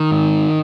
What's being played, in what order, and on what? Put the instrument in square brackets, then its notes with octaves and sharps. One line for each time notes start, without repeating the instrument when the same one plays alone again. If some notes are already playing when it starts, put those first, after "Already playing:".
Already playing: [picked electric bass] D#3
G#2